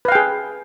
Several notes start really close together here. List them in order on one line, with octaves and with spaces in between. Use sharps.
B4 F5 G5 G#4